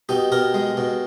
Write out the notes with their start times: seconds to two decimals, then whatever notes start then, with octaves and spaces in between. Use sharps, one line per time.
0.09 B2 D#4 G4
0.32 B2 G4 A#4
0.54 G#3
0.77 B2